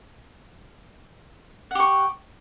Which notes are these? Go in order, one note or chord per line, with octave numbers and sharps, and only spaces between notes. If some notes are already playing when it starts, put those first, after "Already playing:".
G4 F#5 C#6